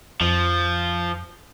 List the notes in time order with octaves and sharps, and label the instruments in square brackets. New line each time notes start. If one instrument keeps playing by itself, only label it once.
[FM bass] F2 [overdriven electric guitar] F3